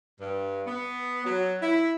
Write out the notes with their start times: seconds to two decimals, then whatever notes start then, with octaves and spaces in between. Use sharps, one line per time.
0.20 G2
0.66 B3
1.25 F#3
1.62 E4